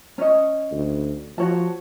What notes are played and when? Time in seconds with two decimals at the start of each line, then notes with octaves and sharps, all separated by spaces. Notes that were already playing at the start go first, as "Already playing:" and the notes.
0.18 C#4 C#5 D#5
0.71 D2
1.38 F3 F#4 C#5 A5